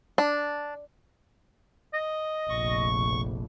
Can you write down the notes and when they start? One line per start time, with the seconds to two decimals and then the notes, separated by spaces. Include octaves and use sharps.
0.18 D4
1.94 D#5
2.49 F1 A#1 C#6